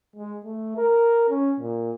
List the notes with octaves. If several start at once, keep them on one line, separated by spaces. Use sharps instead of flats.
G#3
A3
A#4
C#4
A#2